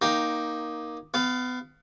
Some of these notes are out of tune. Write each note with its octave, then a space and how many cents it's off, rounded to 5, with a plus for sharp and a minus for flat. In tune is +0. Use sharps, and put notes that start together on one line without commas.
A#3 +15 D#4 +0 G5 +0
B3 +30 F5 +0